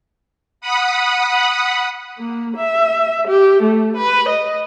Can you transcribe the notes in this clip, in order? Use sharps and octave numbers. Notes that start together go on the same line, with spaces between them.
F#5 B5 D#6
A#3
E5
G4
A3
B4
D#5